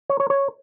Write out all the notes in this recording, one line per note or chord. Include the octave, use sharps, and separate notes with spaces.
C#5
C#5
C#5